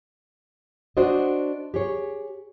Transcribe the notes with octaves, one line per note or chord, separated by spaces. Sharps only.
D4 F#4 C5 D5 D#5
G4 G#4 C#5